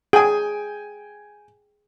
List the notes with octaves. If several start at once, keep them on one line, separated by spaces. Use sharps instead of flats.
G#4 G5 G#5